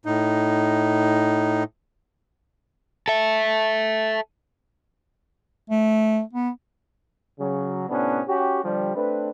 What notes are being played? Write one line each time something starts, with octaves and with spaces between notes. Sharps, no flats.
A2 D#4
A4 E5
A3
B3
C#3 F#3
A2 C3 B3 C#4 D4
C#4 F#4 G4
D3 F3 G3
A3 C4 D4 B4